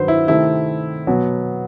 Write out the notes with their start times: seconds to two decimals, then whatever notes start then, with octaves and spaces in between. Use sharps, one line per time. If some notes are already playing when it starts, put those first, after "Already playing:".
Already playing: G2 D#3 F#3 B4 C5
0.08 E4
0.28 C3 D#3 A3 C4 E4
1.07 B2 F#3 B3